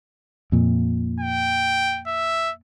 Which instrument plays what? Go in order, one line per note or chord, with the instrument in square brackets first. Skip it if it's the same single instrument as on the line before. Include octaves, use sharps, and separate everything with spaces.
[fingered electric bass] F2 A#2
[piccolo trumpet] G5
E5